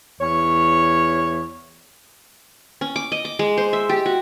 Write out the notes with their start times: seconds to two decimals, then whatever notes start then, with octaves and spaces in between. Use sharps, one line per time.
0.21 E2 C#5
2.81 C#4
2.96 D6
3.12 D#5
3.25 D6
3.39 G#3
3.58 C5
3.73 E5
3.89 G4
4.06 F#4